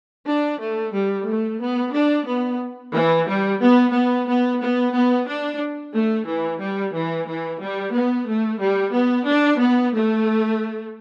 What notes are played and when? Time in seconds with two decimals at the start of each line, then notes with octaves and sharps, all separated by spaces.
0.27 D4
0.60 A3
0.94 G3
1.26 A3
1.60 B3
1.94 D4
2.26 B3
2.93 E3
3.26 G3
3.60 B3
3.94 B3
4.27 B3
4.60 B3
4.93 B3
5.27 D4
5.94 A3
6.27 E3
6.60 G3
6.94 E3
7.28 E3
7.61 G3
7.93 B3
8.28 A3
8.60 G3
8.93 B3
9.28 D4
9.60 B3
9.94 A3